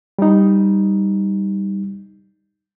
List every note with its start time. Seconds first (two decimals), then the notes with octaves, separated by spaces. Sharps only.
0.19 G3 D#4